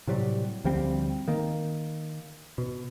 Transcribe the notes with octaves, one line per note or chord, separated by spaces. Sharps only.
A2 C3 F#3 G3
D2 F3 G3 C4
D#3 A#3
B2